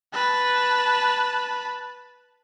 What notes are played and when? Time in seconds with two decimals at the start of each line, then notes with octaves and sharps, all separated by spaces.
0.13 B4 A5